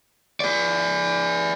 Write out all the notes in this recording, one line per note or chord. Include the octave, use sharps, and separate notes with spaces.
G#4 D5